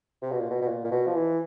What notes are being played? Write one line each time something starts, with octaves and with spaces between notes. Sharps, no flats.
C3
B2
A#2
B2
B2
A#2
A#2
B2
F3
E3